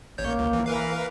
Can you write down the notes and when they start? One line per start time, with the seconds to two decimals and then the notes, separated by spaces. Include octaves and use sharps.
0.18 A1 A#3 C#5 G6
0.39 C#2
0.53 E3
0.66 E3 A#4 B4 F5